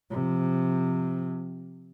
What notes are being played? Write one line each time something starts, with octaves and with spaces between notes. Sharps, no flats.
C3 F3